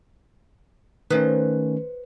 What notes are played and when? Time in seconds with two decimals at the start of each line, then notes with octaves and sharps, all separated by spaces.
1.11 D#3 A3 C#4 B4 C5